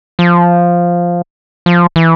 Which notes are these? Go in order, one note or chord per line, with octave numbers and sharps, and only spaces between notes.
F3
F3
E3